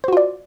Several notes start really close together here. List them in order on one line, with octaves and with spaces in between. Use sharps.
C5 F#4 F4 D5